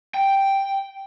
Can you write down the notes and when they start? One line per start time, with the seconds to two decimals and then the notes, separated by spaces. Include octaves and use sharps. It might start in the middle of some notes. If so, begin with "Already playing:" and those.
0.14 G5